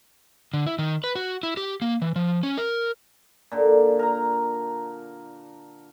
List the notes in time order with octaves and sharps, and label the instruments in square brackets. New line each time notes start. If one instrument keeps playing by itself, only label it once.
[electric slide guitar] D3
E4
D#3
B4
F#4
E4
G4
A#3
E3
F3
C#4
A#4
[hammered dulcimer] A#2 D3
A#4 A#5